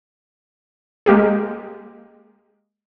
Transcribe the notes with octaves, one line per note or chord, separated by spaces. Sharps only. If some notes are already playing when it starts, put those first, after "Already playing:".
G#3 A#3 G4 G#4